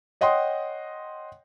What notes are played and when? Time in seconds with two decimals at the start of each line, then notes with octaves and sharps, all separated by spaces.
0.21 C#5 D#5 F#5 G5 C6 D#6